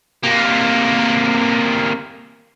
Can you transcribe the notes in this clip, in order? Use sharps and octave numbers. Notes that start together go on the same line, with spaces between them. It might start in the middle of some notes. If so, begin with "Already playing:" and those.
C3 A#3